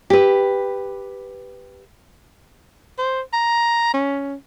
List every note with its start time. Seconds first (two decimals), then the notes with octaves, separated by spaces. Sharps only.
0.10 G4 B4
2.98 C5
3.33 A#5
3.94 C#4